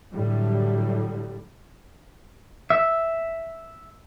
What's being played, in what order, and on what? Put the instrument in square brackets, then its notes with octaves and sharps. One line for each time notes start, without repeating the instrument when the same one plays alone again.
[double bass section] A2 D3 F#3 G3
[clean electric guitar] E5